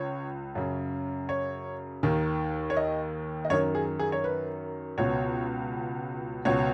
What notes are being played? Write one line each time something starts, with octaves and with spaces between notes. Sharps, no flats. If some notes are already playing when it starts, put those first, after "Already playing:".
Already playing: C#2 C#5
F#2 C#3
C#5
D#2 D#3
C#5
D#5
D#5
F#2 D#3 C#5
G#4
G#4
C#5
B4
C#2 B2 C#5
C#2 B2 C#5